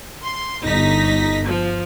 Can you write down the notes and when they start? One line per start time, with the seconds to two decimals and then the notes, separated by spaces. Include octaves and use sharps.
0.23 C6
0.64 G1 D#4 A#6 B6
1.46 F3